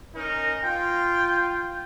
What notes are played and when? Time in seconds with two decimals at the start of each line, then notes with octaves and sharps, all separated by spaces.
0.16 C#4 D#4 A#4
0.64 F4 G5